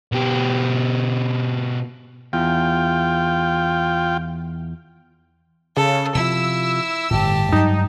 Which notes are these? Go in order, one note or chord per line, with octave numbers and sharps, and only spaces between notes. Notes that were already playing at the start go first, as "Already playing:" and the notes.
B2 G4
E2 F4 G5
C#3 A4
C3 F3 E4 E6
G1 A2 G4 A5
G2 F#3 G#3 D#4